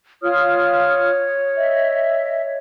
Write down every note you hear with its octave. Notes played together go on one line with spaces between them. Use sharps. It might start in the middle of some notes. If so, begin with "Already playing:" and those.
F4 C#5 D#6 F6
D#5 E5